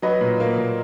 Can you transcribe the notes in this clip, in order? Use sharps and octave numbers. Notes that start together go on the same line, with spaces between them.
F#3 B4 D#5
A#2
A#3
A#2